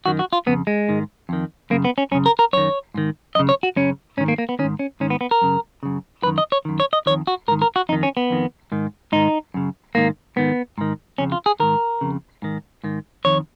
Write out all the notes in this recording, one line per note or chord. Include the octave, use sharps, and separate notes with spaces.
F#2 D#3 F#4
F#4
F4
F2 C#3 B3
G#3
G#2 D#3
F2 D#3
F#2 C#3 A#3
B3
C#4
F#2 C#3 C#4
A#4
A#4
F#2 D#3 C#5
G#2 D#3
F#2 C#3 D#5
C#5
F#4
F#2 C#3 C#4
G#2 D#3 C#4
A#3
A#3
B3
G#2 D#3 C#4
C#4
G#2 D#3 C#4
B3
B3
A#4
F#2 C#3
F#2 C#3
F#2 D#3 B4
D#5
C#5
F#2 D#3
C#5
D#5
F2 D#3 C#5
F#4
G#2 D#3 A#4
A#4
F#4
F2 D#3 D#4
C#4
B3
F2 D#3
G#2 D#3
G#2 D#3 D#4
F#2 C#3
G#2 D#3 A#3
G#2 D#3 B3
G#2 D#3
F2 C#3 C#4
F4
G#4
G#2 D#3 A#4
F2 C#3
G#2 D#3
G#2 D#3
F2 D#3 C#5